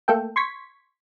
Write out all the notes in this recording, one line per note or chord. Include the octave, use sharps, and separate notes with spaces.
A3 A#3 A4 G5
C6 C#6 G#6 B6